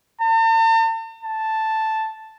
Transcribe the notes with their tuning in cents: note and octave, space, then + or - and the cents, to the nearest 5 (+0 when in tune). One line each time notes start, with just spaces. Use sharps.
A5 +45
A5 +0